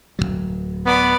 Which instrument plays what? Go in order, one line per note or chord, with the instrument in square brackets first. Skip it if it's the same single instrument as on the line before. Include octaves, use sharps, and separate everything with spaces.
[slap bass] D1 D#2 F#3
[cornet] B3 [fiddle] D5 B5